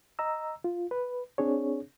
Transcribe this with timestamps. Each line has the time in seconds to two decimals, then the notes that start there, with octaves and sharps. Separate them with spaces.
0.19 D#5 A#5 E6
0.64 F4
0.91 B4
1.38 C4 D4 G#4 C#5